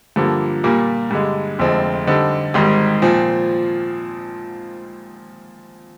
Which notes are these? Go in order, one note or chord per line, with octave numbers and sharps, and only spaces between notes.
G2 D3 F3 A#3
A#2 G3 A#3
G2 D3 G#3
F1 F2 D3 G#3 C4
D3 G3 C4 D#4
G#1 G#2 D#3 G3
A#2 F3 C4